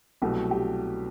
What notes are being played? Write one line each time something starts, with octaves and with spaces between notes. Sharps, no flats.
C2 B2 F#3 A3 G4
G4